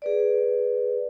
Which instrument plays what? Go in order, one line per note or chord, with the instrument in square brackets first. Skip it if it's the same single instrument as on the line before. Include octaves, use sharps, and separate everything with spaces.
[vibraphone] G#4 B4 D5